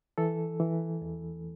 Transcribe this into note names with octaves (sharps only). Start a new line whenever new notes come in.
E3 A4
E3
E2